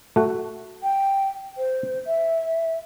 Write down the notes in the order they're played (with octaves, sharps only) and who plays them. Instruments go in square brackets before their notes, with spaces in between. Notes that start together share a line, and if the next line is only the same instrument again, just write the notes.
[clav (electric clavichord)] A3 F#4
[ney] G5
C5
E5